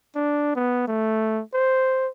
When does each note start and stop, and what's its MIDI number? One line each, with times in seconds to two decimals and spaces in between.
0.15 0.51 62
0.55 0.86 59
0.87 1.42 57
1.54 2.08 72